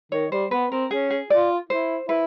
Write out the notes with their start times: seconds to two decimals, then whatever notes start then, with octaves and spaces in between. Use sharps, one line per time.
0.12 D#3 C#5
0.32 G3 C5
0.51 B3 B4
0.71 C4 A#4
0.91 C#4 G#4
1.10 G#4
1.30 F4 D5
1.69 E4 C5
2.09 E4 B4